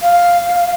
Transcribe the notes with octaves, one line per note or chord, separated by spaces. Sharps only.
F5